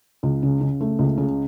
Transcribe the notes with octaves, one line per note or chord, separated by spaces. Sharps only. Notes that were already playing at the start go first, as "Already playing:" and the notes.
C#2
C#3
C#3
A3
C#2
C#3